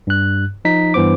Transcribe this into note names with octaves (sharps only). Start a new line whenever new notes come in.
G2 F#6
F3 D#4 B6
G2 E3 B3 C5 D6